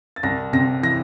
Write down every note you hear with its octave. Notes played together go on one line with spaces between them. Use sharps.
A6
C2 A#6
C3 A#6
E3 A#6